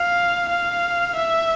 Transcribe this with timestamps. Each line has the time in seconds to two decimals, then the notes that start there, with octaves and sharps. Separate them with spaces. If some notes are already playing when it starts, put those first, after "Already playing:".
Already playing: F5
0.50 F5
1.16 E5